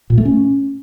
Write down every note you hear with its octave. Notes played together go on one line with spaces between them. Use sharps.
A#2
A3
C#4